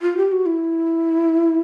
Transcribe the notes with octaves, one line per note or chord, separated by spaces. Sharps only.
F4
G4
F#4
E4